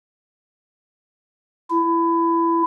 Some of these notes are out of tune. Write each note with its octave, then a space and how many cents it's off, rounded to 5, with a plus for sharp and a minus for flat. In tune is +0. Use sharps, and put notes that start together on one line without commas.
E4 +20